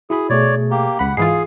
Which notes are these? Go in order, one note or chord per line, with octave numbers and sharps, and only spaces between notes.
E4 F#4 G#4 B5
B2 A3 G#4 C#5 D5
A#3 G4
C#2 F#5 B5
G#2 E3 F4 G#4 C7